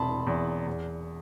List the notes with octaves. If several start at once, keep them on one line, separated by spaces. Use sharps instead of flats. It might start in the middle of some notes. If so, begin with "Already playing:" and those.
Already playing: E1 C3 A5 B5 C6
E2
E2